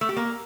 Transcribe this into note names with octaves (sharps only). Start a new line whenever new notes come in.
A3
G4
A#3